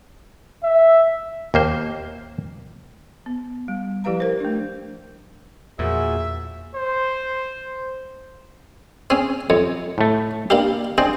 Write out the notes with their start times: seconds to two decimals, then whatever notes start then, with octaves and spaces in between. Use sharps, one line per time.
0.64 E5
1.54 D#2 A#3 C5
3.26 B3
3.68 G3
4.04 F3 E4 G4 B4 F5 A#5
4.20 A#4 C5
4.40 A3 D4
5.79 E2 A#2 F3 F#4 G#4 E5
6.75 C5
9.10 C4 C#4 G#4
9.50 F2 C#5
9.98 A2 A3
10.50 A#3 D4 G4 F5
10.98 C4 D4 G#4